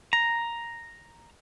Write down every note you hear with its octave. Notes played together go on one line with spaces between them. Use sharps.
A#5